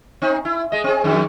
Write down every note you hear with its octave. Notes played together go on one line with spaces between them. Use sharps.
C4 D#4
E4
G#3 D#5
C4 G#4
F2 D#3 F#3